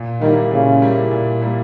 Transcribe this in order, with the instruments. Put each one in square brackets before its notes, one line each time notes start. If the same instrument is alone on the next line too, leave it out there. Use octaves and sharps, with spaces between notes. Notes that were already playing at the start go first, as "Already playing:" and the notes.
Already playing: [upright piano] A#2
[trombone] D#3 [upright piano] G3 A#3 E4
[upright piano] A#2 [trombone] C#3
[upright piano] G3 A#3 E4
A#2
G3 A#3 E4